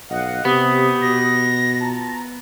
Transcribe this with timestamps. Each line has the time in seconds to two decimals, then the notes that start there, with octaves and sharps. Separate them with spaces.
0.10 B1 D#5 F5 F#5
0.45 C3 B3 G4 D#6
1.02 B2 A#6
1.81 F4 A5 A#5